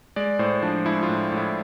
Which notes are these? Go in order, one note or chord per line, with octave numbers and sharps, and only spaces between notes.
G#3 D5
A2 C5
F3 D4
G#3 E4
F4
A2
A2
E4